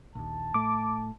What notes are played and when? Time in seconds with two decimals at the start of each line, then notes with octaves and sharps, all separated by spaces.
0.15 A#1 D#2 A5
0.54 A2 A3 D6